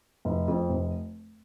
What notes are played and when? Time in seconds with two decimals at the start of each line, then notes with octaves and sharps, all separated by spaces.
0.25 F1
0.48 F2
0.69 F1